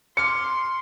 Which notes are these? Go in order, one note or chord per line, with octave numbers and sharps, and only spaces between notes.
C6 D6 F6 C#7